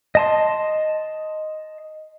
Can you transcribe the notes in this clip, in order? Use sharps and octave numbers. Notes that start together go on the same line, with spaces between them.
D#5 A5 C6